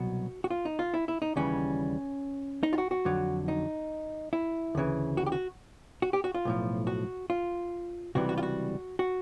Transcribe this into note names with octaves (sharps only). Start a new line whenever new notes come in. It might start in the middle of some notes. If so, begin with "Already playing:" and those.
Already playing: C2 B2 F#3 F#4
F#4
F4
D#4
F4
E4
E4
D#4
D#2 C#3 E3 G3 C#4
D#4
F4
F#4
F#4
F2 D3 F#3
D#4
E4
D2 C#3 E3
F#4
G4
F#4
F#4
G4
F#4
F4
B1 A2 F3
F#4
F4
C#2 C3 E3 G3 F#4
F#4
F4
F#4
F#4